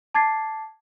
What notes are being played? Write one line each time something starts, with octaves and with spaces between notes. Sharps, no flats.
A5 D6 G#6 A6 C7